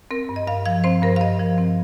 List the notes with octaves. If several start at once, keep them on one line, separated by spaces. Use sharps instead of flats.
C4 A#4
G2
D#5
G2 F5
F3 F5
C4 C5
G2 A#4
F5
G2 D#5
F3
C4